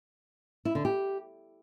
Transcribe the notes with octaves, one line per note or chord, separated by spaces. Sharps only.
E4
D3
G4